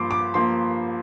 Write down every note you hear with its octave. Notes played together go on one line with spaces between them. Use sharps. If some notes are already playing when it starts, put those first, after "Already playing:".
Already playing: G2 F3 A#3 C6 D6
D6
F3 A#3 C6